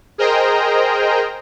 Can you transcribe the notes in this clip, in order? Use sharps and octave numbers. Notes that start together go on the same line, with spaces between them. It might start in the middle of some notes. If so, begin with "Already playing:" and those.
G#4 A#4 C5 D#5 G5 A#5